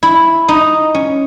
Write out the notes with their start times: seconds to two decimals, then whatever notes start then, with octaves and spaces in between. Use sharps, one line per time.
0.03 E4
0.48 D#4
0.95 C#4